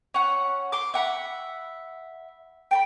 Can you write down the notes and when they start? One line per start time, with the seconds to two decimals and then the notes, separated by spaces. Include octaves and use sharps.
0.14 C#4 F#5
0.72 C6 D6
0.94 E5 F#5 A#5 B5
2.71 G5 A5 B5